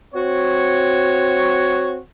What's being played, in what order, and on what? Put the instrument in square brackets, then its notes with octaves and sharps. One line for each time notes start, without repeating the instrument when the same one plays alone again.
[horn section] C4 F#4 C#5